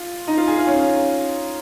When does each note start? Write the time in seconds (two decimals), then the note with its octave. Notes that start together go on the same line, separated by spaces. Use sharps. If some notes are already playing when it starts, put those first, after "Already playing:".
Already playing: F4
0.27 D#4
0.37 F4
0.47 G#4
0.58 F4
0.67 C#4